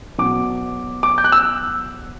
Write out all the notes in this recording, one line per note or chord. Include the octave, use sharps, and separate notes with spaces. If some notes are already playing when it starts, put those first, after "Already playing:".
B2 F#3 D6
D6
G6
F#6
E6